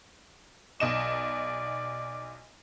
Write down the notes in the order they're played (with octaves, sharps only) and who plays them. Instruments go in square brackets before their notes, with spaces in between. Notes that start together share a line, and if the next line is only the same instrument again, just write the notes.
[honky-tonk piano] B1 D#5 E7 [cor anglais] D5